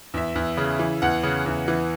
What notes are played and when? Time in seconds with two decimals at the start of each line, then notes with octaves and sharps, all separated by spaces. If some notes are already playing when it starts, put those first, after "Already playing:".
0.14 E2 E5
0.35 E2
0.57 C#3
0.79 E3
1.02 E2 F#5
1.23 C#3
1.46 E2
1.68 E3